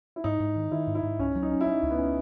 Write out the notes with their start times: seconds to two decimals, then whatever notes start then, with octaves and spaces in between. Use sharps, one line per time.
0.16 E4
0.24 G#2 D#4
0.40 G#2
0.56 D#3
0.71 D#3 E4
0.87 G#2
0.95 E4
1.03 G#2
1.19 C#2 C#4
1.35 F#3
1.43 D#4
1.52 C#4
1.61 E4
1.67 C#4 D#4
1.83 C#2
1.91 B3
1.98 C#4